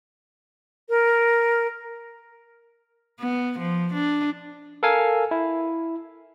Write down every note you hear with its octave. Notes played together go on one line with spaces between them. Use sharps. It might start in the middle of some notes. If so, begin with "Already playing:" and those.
A#4
B3
F3
D4
A4 A#4 F5 G#5
E4